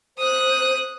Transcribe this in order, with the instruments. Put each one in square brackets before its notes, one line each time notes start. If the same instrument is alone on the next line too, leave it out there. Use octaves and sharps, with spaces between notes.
[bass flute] C5 [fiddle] D#6 F#6